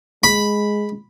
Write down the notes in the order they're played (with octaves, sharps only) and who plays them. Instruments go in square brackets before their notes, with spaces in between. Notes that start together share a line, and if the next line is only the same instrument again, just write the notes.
[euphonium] G#3 [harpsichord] B5